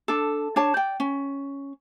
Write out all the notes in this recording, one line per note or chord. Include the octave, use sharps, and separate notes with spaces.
D4 A4
D4 C#5 A5
D5 G5
C#4